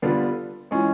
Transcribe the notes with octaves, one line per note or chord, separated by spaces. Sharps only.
D3 G3 B3 D4 F4
E3 G#3 C#4 F4